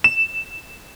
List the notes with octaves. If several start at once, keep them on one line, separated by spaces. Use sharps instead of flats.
E7